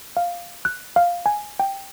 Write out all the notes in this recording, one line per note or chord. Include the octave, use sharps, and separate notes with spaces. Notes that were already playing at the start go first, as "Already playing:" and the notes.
F5
F#6
F5
G#5
G5